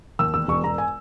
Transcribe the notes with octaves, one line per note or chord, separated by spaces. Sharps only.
D#2 E6
E1 E6
E1 C#6
E1 A#5
G#5